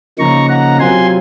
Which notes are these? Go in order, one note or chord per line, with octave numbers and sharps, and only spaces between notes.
C#3 F3 A#3 D#4 A#5 C#6
F#5 A#5
C3 F#3 C4 F4 G#5 C6